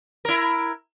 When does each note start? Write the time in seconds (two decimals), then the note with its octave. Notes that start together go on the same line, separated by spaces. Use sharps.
0.25 E4 A#4